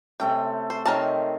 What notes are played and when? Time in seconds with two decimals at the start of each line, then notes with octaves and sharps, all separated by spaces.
0.20 C3 A3 C#4 G5
0.70 C5
0.86 C3 D#3 C#4 A#4 A5